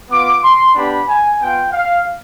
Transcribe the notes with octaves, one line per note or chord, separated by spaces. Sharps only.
B3 F4 D6
C6
B3 D4 G4 B5
G#5
B3 F4 G5
F5